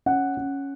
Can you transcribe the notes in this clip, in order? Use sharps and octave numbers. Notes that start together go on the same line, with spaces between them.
C#4 F#5
C#4